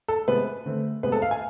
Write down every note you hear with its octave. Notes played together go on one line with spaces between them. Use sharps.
A4
C3 G#3 B3 B4
D3 A3 C4
C3 G#3 B3 B4
A4
F5
G#5